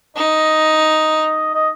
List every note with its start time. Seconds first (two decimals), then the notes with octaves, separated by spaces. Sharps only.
0.16 D#4 D#5
1.54 D#5